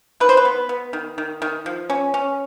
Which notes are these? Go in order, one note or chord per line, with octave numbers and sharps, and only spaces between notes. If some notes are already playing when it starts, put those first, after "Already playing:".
D#3 B4
C5
B4
B3
B3
D#3
D#3
D#3
F3
C#4
C#4